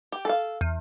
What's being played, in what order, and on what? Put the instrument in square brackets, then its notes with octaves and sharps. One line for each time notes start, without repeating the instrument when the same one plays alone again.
[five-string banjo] G4
A4 F5
[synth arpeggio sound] E2